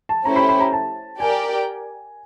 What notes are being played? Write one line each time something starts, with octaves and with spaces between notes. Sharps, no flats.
A5
A3 C#4 E4 G4 C5 A#5
B5
B5
A#5
A5
G4 A#4 D5 G5 G#5